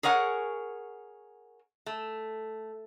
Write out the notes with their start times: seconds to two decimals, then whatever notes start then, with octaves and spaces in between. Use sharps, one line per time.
0.03 G#4 A#4 C#5 F#5 G#5
1.86 A3